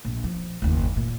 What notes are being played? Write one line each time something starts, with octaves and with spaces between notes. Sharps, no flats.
A#1
F3
F#1 D#2
A#2